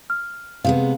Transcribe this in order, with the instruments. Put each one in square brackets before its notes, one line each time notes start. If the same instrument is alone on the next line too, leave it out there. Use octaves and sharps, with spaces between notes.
[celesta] F6
[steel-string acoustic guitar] C3 G#3 B3 [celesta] F5